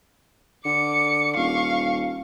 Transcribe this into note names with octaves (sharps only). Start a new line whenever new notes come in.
D3 D6 C#7
D#1 F5 C#6